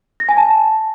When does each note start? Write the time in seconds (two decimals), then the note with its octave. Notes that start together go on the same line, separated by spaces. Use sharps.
0.20 A#6
0.29 G#5
0.37 A5